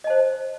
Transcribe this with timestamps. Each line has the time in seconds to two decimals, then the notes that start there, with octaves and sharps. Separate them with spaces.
0.04 D#5
0.07 A5
0.10 C5